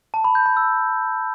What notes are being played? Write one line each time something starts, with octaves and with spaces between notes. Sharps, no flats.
A5
B5
G6
B5
E6